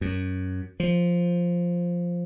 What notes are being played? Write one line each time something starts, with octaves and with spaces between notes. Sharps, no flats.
F#2
F3